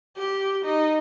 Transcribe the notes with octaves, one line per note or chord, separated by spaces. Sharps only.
G4
D#4